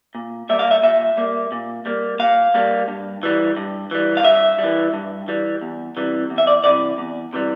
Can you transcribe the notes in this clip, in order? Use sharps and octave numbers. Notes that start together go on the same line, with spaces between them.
A#2
G3 A#3 E5
F5
E5
A#2 E5
G3 A#3
A#2
G3 A#3
A#2 F5
G3 A#3
G2
E3 G3
G2
E3 G3
F5
G2 E5
G3
E3
G2
E3 G3
E2
C3 E3 G3
E2
E5
D5
C3 E3 G3 D5
E2
C3 E3 G3